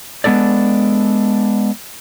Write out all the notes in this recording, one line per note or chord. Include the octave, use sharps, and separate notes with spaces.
G#3 B3 D4 A4 D5